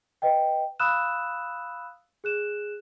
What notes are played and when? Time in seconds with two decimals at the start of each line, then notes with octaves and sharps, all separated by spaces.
0.22 B4 D#5 G5
0.80 F5 B5 D#6 E6 F#6 E7
2.24 G#4 F#6 E7